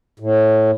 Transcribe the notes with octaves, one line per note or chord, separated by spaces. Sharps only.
A2